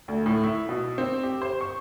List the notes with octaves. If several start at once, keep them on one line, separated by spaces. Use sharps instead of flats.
D2
A2
E4
B2
C4
G4
C5
C#6